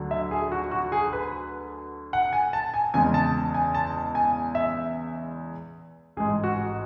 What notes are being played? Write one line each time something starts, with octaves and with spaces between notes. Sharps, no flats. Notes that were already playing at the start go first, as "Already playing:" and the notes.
Already playing: D2 D3 F#3
E5
G#4
F#4
F#4
G#4
B4
F#5
G#5
A5
G#5
E2 C#3 G#3 G#5
A5
G#5
A5
G#5
E5
A1 G#2 G#3 G#4
F#4